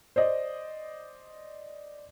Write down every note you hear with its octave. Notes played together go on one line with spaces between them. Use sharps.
C5 D5 D#5